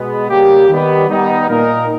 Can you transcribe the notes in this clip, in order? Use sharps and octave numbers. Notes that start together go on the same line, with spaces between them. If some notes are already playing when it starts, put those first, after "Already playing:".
Already playing: B2 G#3 B3
C#3 G3 A#3 C#4 G4
D#3 G3 B3
G3 B3 D#4
A#2 A#3 D#4 A#4